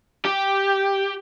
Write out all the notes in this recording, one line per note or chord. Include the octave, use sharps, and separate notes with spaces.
G4